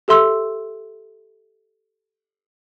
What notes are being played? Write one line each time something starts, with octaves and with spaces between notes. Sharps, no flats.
G4 A4 E5 C6 E6